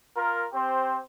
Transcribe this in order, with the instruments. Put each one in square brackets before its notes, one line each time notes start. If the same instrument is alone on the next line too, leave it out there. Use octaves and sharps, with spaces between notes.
[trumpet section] F4 A#4
C4 G4 C5